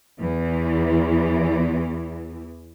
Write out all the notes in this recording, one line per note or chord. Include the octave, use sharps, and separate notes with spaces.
E2 E3